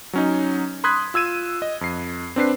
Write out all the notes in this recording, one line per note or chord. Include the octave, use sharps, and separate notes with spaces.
F#3 C#4 D#4
B5 C6 D#6 F#6 G#6 B6
F4 E6 G#6 D#7 E7
D#5
F2 C7
C4 D4 B4 C7